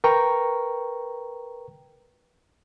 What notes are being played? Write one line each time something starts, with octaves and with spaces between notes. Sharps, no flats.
A#4 B4 G5 A#5 C#6